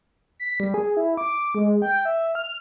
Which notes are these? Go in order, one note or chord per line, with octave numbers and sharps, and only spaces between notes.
B6
G3
G#4
E4
D6
G#3
G5
E5
F6